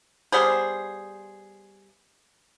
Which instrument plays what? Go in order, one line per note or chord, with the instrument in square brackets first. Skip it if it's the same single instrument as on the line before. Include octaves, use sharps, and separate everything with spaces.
[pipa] G3 B3 G#4 C5